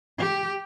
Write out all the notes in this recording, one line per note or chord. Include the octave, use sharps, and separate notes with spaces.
G4